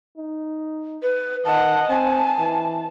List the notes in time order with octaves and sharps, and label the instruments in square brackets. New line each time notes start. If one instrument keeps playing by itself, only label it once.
[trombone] D#4
[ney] B4
[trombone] D#3 [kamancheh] D#5 F#5 [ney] A5
[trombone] C4 [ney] G#5 [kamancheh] A5
[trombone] E3